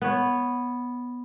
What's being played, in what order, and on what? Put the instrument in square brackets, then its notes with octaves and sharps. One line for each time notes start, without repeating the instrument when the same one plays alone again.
[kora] B3 C#5